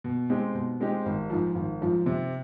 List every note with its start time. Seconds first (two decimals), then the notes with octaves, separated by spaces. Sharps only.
0.04 B2
0.30 G#3 C4 D#4 G4
0.55 B2
0.80 G#3 C4 D#4 G4
1.06 G#1
1.30 G#2 F3
1.55 G#1
1.81 G#2 F3
2.06 C3